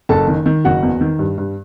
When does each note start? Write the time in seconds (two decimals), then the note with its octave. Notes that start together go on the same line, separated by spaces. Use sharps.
0.09 F#1 A4 A5
0.28 D#3
0.46 D#3
0.65 F#1 F#4 F#5
0.83 E2
1.01 D#3
1.19 G2
1.38 G2